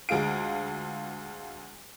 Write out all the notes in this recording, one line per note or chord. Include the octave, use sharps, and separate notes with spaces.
D2 G#3 F4 D7